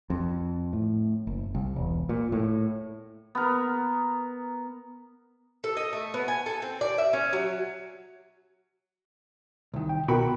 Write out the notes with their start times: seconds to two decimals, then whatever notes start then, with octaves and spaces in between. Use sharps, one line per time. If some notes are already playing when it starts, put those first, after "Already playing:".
0.10 F2
0.73 A2
1.27 F#1
1.55 C2
1.76 E1
2.09 A#2
2.32 A2
3.35 B3 A#4
5.64 A4
5.77 D#5
5.93 A3
6.14 B3
6.28 G#5
6.46 A4
6.62 C4
6.81 D5
6.98 E5
7.13 C#4
7.33 F#3
9.74 C2 D#3
9.89 G5
10.08 B2 F#4 A#4 G5 B5